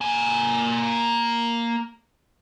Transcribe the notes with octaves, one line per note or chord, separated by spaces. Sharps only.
A#3 G#5